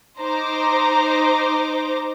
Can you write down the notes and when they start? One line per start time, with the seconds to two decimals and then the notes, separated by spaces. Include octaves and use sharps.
0.19 D#4 C5 A#5 D6